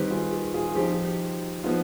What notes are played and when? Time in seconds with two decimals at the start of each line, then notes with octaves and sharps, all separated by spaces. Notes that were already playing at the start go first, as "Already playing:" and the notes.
Already playing: D#3 G3 C4 D#4 G4 B4
0.10 F4 G#4
0.32 G4
0.54 F4 G#4
0.75 F3 C4 D#4 G4
0.91 G4
1.05 G4
1.64 F3 B3 D#4 F4